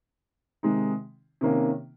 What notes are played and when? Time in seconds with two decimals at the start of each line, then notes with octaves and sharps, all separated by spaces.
0.63 C3 D#3 G#3 D#4
1.41 C3 D#3 A#3 C#4